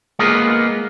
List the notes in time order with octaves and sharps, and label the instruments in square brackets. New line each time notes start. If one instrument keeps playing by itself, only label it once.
[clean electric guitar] G#3 A#3 B3 F4 G#4 A#4